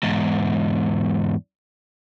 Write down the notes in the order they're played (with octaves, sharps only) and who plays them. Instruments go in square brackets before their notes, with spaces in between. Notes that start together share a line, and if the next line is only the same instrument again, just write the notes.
[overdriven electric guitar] E2 G#2